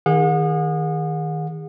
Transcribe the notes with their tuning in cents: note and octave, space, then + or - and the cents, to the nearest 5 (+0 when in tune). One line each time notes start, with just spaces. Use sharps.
D#3 +10 G#4 -30 F#5 -40